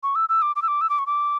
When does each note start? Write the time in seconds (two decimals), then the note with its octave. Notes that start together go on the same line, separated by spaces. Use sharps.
0.03 C#6
0.15 E6
0.29 E6
0.42 D6
0.56 D6
0.62 E6
0.68 D6
0.81 E6
0.90 D6
0.99 C#6
1.07 D6